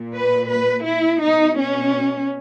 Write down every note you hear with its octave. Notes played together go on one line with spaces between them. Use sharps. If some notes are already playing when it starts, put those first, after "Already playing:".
Already playing: A#2
B4
B4
E4
B2 D#4
C#4